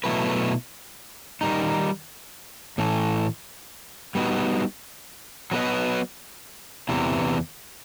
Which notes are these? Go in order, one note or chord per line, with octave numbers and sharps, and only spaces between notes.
B2 F#3 A3 E4 B4
D#3 G3 D#4
A2 E3 A3
G3 B3 D#4 F#4
F#3 B3 F#4 B4 D#5
E2 C3 E3